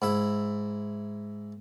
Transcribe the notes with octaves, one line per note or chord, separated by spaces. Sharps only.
G#2 E4 E5